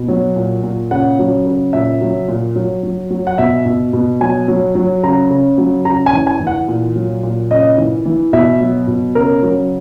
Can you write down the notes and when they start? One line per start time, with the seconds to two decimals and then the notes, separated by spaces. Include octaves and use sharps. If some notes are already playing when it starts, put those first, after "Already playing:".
Already playing: B2
0.08 F#3
0.36 A#2
0.63 A#2
0.91 C#3 F#5
1.19 F#3
1.46 C#3
1.73 A#2 E5
2.01 F#3
2.28 A#2
2.56 F#3
2.83 F#3
3.11 F#3
3.27 F#5
3.38 B2 E5
3.66 B2
3.93 B2
4.21 F#3 G#5
4.48 F#3
4.75 F#3
5.03 C#3 A#5
5.31 C#3
5.58 F#3
5.85 C#3 A#5
6.06 G#5
6.13 E3
6.27 G#5
6.40 E3
6.47 F#5
6.68 A#2
6.96 F#3
7.23 A#2
7.50 C#3 D#5
7.78 E3
8.06 E3
8.33 B2 E5
8.60 F#3
8.88 B2
9.15 C#3 A#4
9.43 F#3